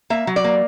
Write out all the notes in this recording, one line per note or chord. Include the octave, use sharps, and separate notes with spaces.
A#3 E5
F#3
D5
A#3